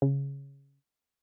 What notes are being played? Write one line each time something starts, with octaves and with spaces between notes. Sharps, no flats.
C#3